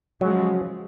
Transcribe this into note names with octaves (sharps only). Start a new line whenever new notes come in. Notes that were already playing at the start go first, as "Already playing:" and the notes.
C#3 F3 F#3 G#3